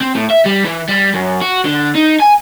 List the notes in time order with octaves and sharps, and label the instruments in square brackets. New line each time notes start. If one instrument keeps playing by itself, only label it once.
[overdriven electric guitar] C4
A2
E5
G3
E3
G3
F#2
F#4
D3
D#4
G#5